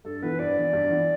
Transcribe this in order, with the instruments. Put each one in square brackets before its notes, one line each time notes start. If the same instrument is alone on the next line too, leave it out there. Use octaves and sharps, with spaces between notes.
[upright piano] G2 [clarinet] A4
[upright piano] E3 B3 E4 [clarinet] B4
[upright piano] G2 [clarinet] D5
[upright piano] E3 B3 E4
G2
E3 B3 E4